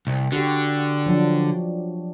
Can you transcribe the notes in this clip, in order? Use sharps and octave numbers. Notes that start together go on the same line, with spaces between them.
C2
D3 F#4 G4
F3 F#3 D4